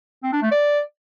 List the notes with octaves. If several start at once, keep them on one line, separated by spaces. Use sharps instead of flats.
C4
D4
A3
D5